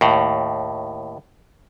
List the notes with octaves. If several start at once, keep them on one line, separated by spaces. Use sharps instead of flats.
D#2 A2